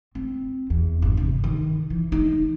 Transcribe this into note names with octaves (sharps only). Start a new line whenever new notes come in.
C4
E2
G1
C3
D#3
E3
D#4